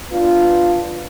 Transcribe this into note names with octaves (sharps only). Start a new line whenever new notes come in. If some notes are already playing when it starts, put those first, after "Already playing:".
B3 D4 F4